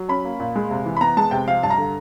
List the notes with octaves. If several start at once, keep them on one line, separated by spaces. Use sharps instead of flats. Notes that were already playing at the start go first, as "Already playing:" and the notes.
Already playing: F#3
C#4 B5
A#3
A#2
G#3
C3
E3
B5
B3 A#5
G#3 A5
C3 G5
F3 F5
G2 A5
A#5
D3